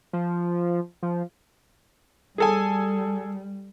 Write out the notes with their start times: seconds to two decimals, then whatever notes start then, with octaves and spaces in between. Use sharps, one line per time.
0.13 F3
1.03 F3
2.38 G3 G#4 A4 G#5